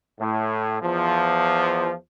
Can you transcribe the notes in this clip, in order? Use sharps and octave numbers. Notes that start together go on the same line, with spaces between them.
A2
E2 F3